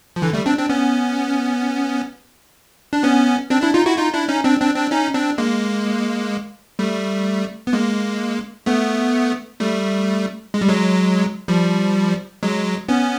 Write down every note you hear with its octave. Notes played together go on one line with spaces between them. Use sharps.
F3
D3 E3
G3 A3
C4 D4
C4 D4
B3 C#4
D4
B3 C#4
C4 D4
D4 E4
D#4 F4
E4 F#4
D#4 F4
D4 E4
C#4 D#4
C4 D4
C4 D4
C4 D4
C#4 D#4
C4 D4
G#3 A#3
G3 A3
B3
G#3 A#3
A3 B3
G3 A3
G#3
G3
F#3 G#3
F3 G3
F#3 G#3
B3 C#4